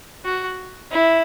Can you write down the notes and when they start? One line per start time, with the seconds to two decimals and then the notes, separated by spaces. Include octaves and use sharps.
0.25 F#4
0.92 E4